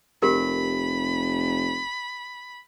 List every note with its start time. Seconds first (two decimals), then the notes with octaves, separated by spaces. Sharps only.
0.22 F1 G4 A#4 B5